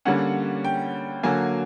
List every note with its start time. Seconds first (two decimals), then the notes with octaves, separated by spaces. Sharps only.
0.05 D3 G3 A#3 C#4 F#5
0.64 G5
1.23 D3 F#3 A#3 G#5